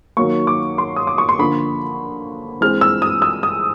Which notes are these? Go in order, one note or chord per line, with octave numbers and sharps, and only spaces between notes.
D#3 F#3 A#3 C#6
D6
C6
D#6
D6
C#6
C6
D3 F3 A#3 B5
E3 G#3 C4 F6
E6
D#6
E6
D#6